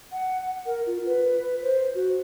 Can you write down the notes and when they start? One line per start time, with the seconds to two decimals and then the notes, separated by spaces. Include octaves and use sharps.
0.12 F#5
0.66 A#4
0.86 F4
1.05 B4
1.62 C5
1.95 F#4